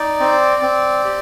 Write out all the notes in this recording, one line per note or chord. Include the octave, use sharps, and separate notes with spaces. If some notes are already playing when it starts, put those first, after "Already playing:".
Already playing: D#4 D5
C4
C4
G4